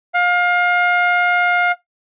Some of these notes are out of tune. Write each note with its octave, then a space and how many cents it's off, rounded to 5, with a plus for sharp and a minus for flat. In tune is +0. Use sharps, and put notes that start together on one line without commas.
F5 +30